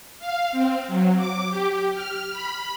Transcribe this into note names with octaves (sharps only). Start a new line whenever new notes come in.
F5
C4
F#3
D6
G4
F6
B5